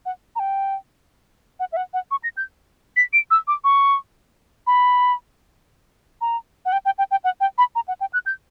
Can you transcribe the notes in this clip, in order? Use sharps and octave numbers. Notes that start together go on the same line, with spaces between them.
F#5
A#5
G5
F#5
E5
F#5
F#5
C#6
A#6
G6
B6
D7
E6
D6
C#6
B5
A#5
F#5
G5
G5
G5
G5
F#5
G5
B5
A#5
F#5
G5
F#6
G6